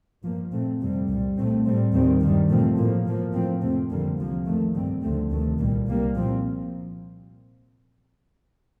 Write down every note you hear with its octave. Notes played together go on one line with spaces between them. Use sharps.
G2 F3 A#3
A#2 A3 C4
F2 C3 G3 C4
C2 A#2 G3
A#2 A3 C4
A2 G3 C4
D#2 D#3 G3 C4
G2 D#3 G3
A#2 F3 A3 C4
A2 F3 A#3
A2 F3 A#3
A2 F3 C4
F2 C3 F3 A3 C4
F2 D3 G3 A#3
C2 C3 F3 A#3
F2 D#3 A3
G2 D3 G3 C4
D2 D3 F3 A3 C4
D2 C3 D#3 A3
C2 A#2 G3 A#3
C2 C3 G3 A#3
A#2 F3 C4